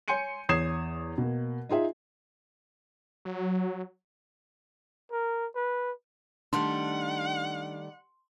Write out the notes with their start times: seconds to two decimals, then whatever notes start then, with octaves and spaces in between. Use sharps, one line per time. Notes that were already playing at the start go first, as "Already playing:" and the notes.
0.08 C#5 G#5 C6 G6 C#7 D#7
0.49 E2 C#5 D#6 G#6 C7 E7
1.18 B2 A#3
1.69 D#4 F4 G#4 E5
3.25 F#3
5.11 A#4
5.55 B4
6.53 D#3 G3 A3 D4 F#5 C6